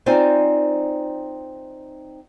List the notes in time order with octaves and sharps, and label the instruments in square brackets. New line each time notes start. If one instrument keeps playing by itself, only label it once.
[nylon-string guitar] C4 D#4 F4 C5 D5 G#5